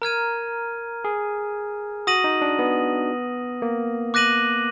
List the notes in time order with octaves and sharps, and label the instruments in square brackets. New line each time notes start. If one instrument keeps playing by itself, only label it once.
[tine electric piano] A#4 [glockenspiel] A#5 F6 G#6 D#7
[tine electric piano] G#4
[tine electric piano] F#4 [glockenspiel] D#6 A#6 D#7 F#7
[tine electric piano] D#4
D4
B3
A#3
[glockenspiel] D6 F#6 A#6 D#7 F#7